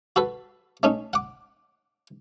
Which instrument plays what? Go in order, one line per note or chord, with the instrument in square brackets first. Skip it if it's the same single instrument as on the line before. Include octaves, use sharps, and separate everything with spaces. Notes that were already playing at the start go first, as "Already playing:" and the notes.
[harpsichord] F#4 A4 B4
A3 C#4 D#4
F#5 D6